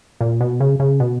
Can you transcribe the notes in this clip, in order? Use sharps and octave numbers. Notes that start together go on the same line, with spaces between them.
A#2
B2
C#3
C#3
B2